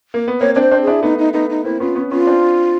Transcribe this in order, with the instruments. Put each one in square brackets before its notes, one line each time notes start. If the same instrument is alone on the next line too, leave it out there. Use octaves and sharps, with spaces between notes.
[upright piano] A#3
B3
[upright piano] A#3 C4 [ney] C#5
[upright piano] C4 D4 [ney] C#5
[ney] C5
[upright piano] C4 D4
[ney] G#4
[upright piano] D4 E4
[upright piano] A3 B3 [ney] D#4
[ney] D#4
[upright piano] A3 B3 [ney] D#4
[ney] D#4
[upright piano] A#3 C4 [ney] E4
[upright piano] B3 C#4 [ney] F4
[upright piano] B3 C#4
[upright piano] B3 C#4 [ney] F4
[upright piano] C4 D4